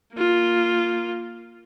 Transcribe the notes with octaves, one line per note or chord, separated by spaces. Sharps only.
A#3 F4